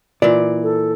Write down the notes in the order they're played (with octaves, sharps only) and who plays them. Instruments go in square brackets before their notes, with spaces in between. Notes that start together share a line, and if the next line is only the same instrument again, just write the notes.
[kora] A#2 E3 [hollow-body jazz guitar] D5
[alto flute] A4